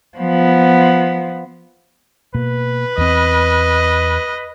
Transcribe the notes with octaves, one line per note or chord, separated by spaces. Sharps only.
F3 B3
B2 A#3 B4
E2 C4 D#5